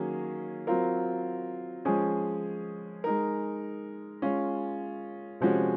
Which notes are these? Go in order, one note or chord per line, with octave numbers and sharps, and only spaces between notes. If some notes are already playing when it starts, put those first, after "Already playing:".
Already playing: D#3 F#3 A#3 C#4 G#4
F#3 C4 F4 A#4
F3 G#3 C#4 G#4
G#3 D#4 A#4
G#3 C#4 F4
C3 F3 G#3 C#4 F#4